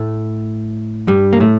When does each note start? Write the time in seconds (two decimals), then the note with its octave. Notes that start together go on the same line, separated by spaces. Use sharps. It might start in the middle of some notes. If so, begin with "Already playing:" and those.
Already playing: A2 A3
1.07 G2 G3
1.33 A#3
1.40 A2 A3